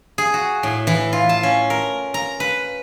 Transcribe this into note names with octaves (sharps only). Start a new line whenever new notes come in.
G#4
F#4
A2
E3
F4
A5
C#4
A#4
A#5
B4